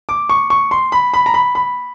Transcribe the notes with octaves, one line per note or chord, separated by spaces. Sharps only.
D6
C#6
C#6
C6
B5
B5
A#5
B5
B5